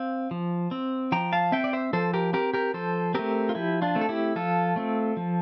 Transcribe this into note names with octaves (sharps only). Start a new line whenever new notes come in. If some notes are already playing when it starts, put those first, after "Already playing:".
Already playing: C4 F5
F3
C4
F3 G5 A#5
F5 A5
C4 E5 G5
D5
C5 E5
F3 A4 C5
G4 A#4
C4 G4 A#4
G4 A#4
F3 A4 C5
A3 C4 G4 A#4
F4
F3 E4 G4
D4 F4
A3 C4
A4
E4 G4
F3 F4 A4
A3 C4
F3